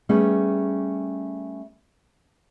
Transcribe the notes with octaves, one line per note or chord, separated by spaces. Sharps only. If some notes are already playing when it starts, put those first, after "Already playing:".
G3 A3 B3 C#4 G#4